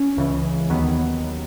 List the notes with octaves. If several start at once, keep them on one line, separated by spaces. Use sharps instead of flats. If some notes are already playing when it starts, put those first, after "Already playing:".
Already playing: C#4
C#2 C#3 E3
D#2 D#3 F#3 B3